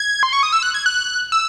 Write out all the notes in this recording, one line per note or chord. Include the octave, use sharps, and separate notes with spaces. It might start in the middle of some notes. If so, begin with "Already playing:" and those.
Already playing: G#6
C6
C#6
D#6
E6
F#6
G#6
F#6
E6